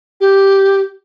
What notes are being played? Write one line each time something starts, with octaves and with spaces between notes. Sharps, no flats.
G4